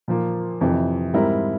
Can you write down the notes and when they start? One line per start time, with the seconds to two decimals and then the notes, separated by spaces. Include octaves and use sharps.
0.08 A#2 F3 A#3
0.61 F2 C3 E3
1.13 G#2 G3 C4 E4 A#4